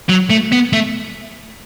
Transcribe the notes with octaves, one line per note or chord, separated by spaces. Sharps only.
F#3
A3
B3
A3